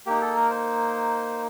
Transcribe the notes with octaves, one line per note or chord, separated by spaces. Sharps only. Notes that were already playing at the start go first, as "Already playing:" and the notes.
A#3 D#4 G4
A4
A#4
C5